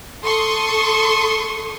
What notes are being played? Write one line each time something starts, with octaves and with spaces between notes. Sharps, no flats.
A4 C6 C#6 D#6